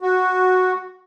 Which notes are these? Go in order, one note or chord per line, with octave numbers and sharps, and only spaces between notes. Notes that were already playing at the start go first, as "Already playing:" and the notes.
F#4